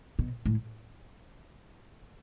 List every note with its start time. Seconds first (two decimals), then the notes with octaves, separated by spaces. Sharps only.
0.19 B2
0.46 A2